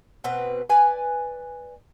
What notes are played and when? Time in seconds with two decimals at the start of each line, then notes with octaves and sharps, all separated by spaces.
0.24 B2 C4 B4
0.69 B4 D5 G#5